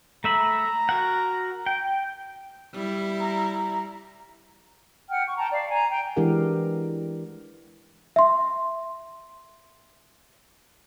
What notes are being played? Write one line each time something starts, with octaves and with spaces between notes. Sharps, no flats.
A3 E5 A#5 B5
F#4 A#4 F#5
G5
G3 E4
A#5
F#5 G5 F6
C#6
G5 A5 A#5
D5 F5
G#5 A#5
G5
E3 G#3 D4 G4 A#4 F#5
E5 C6